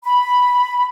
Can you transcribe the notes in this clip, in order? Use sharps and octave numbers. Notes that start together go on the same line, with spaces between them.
B5